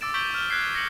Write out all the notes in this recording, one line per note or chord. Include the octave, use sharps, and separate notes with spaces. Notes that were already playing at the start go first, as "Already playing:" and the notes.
D6 E6 A6 D7 E7
C#6 G6 B6 D7 F#7 G7
F6 E7 G7
F#6 G#6 B6 C7
A#6 C#7 F#7